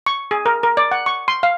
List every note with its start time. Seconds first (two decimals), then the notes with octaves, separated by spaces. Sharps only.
0.06 C#6
0.31 G#4
0.46 A#4
0.63 A#4
0.77 D5
0.91 F#5
1.06 C#6
1.28 C6
1.43 F5